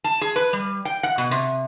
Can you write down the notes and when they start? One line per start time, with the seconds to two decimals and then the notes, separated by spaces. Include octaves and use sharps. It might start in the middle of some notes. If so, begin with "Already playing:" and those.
0.04 A5
0.21 G#4
0.36 B4
0.53 G3
0.85 G5
1.03 F#5
1.18 B2
1.31 C3